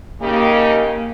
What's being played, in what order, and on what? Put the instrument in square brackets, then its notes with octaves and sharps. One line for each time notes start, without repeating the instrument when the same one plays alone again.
[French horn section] C#3 D#4 G4 [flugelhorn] A#3